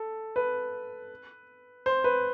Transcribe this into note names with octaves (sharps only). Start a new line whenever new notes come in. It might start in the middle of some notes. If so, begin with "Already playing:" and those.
Already playing: A4
B4
C5
B4